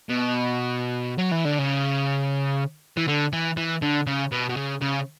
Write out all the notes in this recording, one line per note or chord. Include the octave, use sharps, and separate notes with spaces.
B2
F#3
E3
D3
C#3
E3
D3
E3
E3
D3
C#3
B2
B2
C#3
C#3